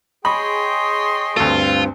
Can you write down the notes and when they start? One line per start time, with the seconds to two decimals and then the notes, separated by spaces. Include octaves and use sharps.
0.25 G#4 C#5 D#5 G5 B5 C6
1.37 D2 G2 C4 F4 A4